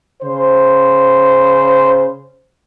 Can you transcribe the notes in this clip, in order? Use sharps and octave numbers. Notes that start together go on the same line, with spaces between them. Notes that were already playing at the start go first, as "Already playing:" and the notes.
C#3 C5